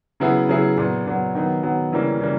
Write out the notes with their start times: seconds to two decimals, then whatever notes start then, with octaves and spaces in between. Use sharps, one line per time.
0.20 C#3 F#3 B3 E4 G#4
0.49 C#3 F#3 B3 E4 G#4
0.77 A#2 F#3 B3
1.06 A#2 F#3 B3
1.35 D#3 F#3 B3
1.63 D#3 F#3 B3
1.92 C#3 E3 G3 A#3 C#4
2.20 C#3 E3 G3 A#3